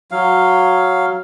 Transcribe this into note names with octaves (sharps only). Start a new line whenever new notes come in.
F#3 F5